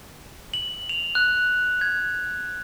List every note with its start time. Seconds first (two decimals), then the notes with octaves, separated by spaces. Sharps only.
0.54 F#7
0.89 F7
1.15 F#6
1.81 G#6